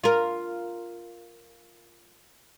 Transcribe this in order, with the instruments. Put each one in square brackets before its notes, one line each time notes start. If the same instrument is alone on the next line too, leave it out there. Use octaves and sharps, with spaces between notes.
[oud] F4 A#4